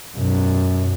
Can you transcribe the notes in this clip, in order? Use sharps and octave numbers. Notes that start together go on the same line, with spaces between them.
F#2 B2